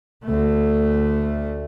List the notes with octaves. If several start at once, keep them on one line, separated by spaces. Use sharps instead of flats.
D2 A3